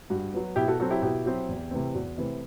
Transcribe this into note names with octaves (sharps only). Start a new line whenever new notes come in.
G2 F#4
F#3 B3
B2 E4 G4
F#4 A4
F#3 C4 F#4 A4
E4 G4
B2 E4 G4
F#3 C4
E2
C3 E3 A3 C4
E2 F#4
C3 E3 A3 C4 E4